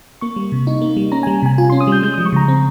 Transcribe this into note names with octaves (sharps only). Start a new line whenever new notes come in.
A#3 C#6
G3
C3
D#4
A#3
G3
C#4 A#5
G3 G#5
C3 G#5
F4 G#5
C#4 C6
D#6
G3 G6
G#3 G6
F3 D#6
C#6
C#3 A#5
C4